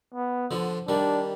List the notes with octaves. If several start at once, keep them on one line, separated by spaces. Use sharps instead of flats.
B3
D3 F3
D#3 G3 D4